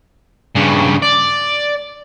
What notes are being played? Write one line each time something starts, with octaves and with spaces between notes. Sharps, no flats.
G2 C#3
D5